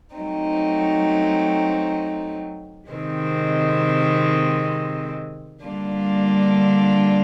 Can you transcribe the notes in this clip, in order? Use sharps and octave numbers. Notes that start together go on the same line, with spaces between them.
F#3 A3 C4 D#4
C3 D#3 G#3 C4
D3 G3 A#3 D4 F4